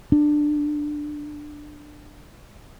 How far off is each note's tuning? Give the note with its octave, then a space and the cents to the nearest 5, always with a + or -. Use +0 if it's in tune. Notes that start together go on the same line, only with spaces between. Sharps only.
D4 +15